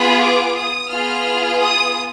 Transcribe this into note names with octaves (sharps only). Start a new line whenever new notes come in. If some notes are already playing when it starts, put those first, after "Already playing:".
Already playing: B3 F4 G#4 B5
D6
D#6
B3 F4 G#4 F6
D#6